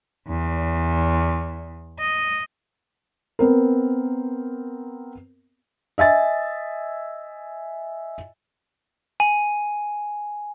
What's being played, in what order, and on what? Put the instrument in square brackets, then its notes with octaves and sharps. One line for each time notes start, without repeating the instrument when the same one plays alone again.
[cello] E2
D#5
[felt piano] B3 C4 A#4
D#5 E5 G#5 A6
[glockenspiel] G#5